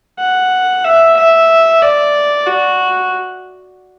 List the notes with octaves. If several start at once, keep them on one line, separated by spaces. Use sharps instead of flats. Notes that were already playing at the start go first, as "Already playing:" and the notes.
F#5
E5
E5
D5
F#4